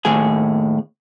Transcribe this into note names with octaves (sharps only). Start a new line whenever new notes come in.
D#2 A2 G#4 G#5